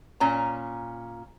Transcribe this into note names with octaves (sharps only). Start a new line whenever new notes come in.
A#2 C#4 A#5